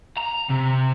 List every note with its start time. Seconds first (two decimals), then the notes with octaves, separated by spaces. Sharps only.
0.17 A#5
0.49 C3